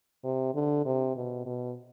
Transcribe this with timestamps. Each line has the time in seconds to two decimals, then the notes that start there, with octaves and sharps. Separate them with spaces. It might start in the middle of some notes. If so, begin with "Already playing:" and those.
0.24 C3
0.54 D3
0.85 C3
1.15 B2
1.46 B2